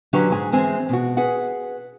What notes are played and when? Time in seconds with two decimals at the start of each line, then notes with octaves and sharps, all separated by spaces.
0.13 D3 F#3 C#4 G4 B4 C#5
0.32 G#2 G#4 G#5
0.52 E3 G#3 C4 G#5
0.89 B2 F#4
1.17 G#4 B4 F#5